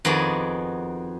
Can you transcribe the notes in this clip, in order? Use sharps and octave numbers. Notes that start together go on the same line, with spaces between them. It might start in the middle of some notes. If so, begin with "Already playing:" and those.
F2 D#3 B3 F#4 G#4 D5